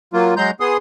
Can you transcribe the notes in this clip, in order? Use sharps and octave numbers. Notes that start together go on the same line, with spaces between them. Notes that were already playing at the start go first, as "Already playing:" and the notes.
F#3 A#3 F4
F#3 G#3 A#5 C6 G6
B3 G#4 C6 D#6